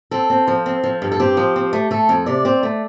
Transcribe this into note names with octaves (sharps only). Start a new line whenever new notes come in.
C4 A4
C4
F3
C4
F3
G2
A4
C4 G4
F3
C4
A3
A3 A4
F2
C3 D5
C4
A3